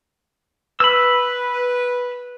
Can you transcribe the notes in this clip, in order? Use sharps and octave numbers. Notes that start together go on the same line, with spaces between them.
B4 B5 E6